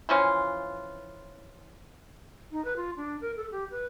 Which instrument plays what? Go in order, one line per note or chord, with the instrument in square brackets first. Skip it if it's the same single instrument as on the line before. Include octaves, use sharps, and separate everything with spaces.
[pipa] E3 F3 C#4 F4
[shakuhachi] D#4
B4
F4
D4
A#4
A4
G4
B4